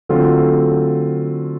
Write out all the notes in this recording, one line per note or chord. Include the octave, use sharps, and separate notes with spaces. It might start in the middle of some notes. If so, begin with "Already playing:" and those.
D3 F#3 A3 C4 F4